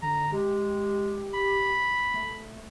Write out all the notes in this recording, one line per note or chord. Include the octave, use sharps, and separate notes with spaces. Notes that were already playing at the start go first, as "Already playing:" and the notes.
D3 A#5
G#3 G4
B5
A3